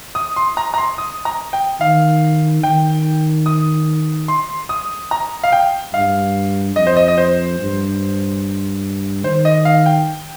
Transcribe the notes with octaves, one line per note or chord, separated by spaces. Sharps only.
D#6
C6
A#5
A#5
C6
D#6
A#5
G5
D#3 F5
D#3 G5
D#6
C6
D#6
A#5
F5
G5
G2 F5
F2 D#5
C5
D#5
D#5
C5
G2
D#3 C5
D#5
F5
G5